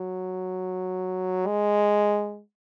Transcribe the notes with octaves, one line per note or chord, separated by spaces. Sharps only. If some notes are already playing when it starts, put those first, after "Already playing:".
Already playing: F#3
G#3